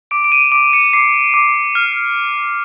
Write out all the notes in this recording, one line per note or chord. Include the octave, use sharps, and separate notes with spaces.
D6 D7
D7
D#7
D6 D7
C#7
D6 C7
D6
F6